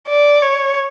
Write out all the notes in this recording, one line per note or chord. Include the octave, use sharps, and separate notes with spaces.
D5
C#5